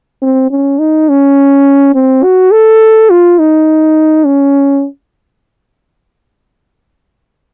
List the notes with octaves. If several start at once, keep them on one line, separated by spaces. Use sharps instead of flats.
C4
C#4
D#4
C#4
C4
F#4
A4
F4
D#4
C#4